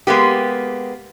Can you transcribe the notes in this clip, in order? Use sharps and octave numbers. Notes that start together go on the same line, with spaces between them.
G#3 A#3 B3 G4